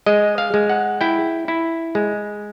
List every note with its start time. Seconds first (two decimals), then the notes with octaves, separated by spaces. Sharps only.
0.06 G#3 D#5
0.38 F5
0.54 G#3
0.70 F#5
1.01 E4 G5
1.48 E4
1.95 G#3